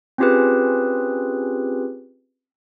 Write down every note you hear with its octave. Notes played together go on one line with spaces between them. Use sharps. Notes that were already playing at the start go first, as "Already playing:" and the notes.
C4 C#4 F4 G4 G#4 B4